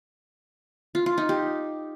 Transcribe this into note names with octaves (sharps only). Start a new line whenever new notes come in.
F4
F4
D#4
G4